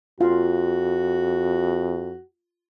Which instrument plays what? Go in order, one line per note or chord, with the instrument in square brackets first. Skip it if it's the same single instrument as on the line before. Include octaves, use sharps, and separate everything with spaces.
[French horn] F2 [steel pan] F4 F5 [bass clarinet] F#4